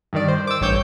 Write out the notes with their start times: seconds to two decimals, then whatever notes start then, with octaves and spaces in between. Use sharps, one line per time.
0.13 G2 D#3 D5
0.28 C5
0.47 D6 E6
0.61 A1 G2 C#5 G6